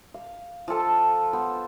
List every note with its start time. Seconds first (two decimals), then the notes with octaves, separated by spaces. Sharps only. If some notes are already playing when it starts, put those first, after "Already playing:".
0.14 F5
0.68 F3 F4 A4 A5
1.33 B3 C5